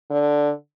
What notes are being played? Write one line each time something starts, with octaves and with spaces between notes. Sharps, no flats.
D3